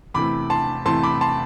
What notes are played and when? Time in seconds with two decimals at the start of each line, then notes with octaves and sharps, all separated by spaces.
0.14 E2 C3 E3 A3 B5 D6
0.50 A5 C6
0.85 E2 C3 E3 A3 A5 C6
1.03 B5 D6
1.21 A5 C6